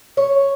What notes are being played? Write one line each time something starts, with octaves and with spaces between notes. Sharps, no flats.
C#5